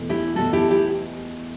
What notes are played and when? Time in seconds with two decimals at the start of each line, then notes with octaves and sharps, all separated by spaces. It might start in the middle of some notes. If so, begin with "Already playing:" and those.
Already playing: E2 B2 A3
0.09 E4 G4
0.35 E2 B2 A3 F#4 A4
0.53 E4 G4
0.70 E4 G4